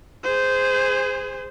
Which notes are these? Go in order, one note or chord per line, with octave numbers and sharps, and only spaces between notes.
G#4 C5